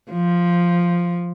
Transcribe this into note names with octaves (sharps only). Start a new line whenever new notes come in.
F3